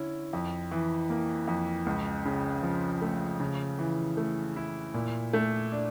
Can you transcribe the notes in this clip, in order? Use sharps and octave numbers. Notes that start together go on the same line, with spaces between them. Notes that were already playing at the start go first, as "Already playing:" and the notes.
Already playing: D3 C#4 E4
F2
E3
A#3
F2
C#2
C#3
F3
A3
C#3
E3
A3
E4
A#2
A3
D4